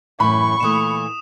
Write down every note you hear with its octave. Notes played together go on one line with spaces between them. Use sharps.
F#2 A2 E3 B5 C#6
A#2 E3 A3 D#6 E7